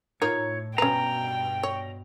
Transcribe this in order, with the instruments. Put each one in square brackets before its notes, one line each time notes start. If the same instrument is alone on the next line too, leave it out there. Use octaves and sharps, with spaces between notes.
[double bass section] A2 [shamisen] D#4 F4 A#4 [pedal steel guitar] C#5
[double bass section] G2 B2 [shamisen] C#4 B4 [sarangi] G5 [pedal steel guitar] A#5
[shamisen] C#5